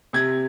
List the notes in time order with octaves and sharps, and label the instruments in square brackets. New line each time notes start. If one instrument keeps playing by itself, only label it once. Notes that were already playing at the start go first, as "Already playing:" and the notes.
[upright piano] C3 G#6